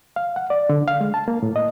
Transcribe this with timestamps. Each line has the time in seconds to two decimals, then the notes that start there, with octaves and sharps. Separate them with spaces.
0.16 F5
0.36 F#5
0.50 D5
0.69 D3
0.88 F5
1.01 G#3
1.14 A5
1.28 A#3
1.43 A2
1.56 D#5